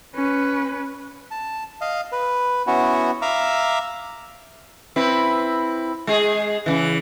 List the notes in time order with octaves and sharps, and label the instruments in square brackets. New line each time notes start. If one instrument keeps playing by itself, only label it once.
[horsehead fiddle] C#4 B4
[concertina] A5
D#5 F5
B4
B3 C#4 E4 F#4
E5 F5 A#5 D6 E6
[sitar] C4 E4 B4
G#3 G#4
C#3 E3